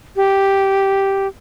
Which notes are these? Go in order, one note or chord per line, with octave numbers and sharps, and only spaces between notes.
G4